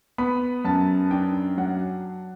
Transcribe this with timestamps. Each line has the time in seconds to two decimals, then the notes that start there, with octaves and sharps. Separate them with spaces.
0.18 B3 B5
0.65 F#2 A5
1.11 D4 G5
1.57 F#3 F#5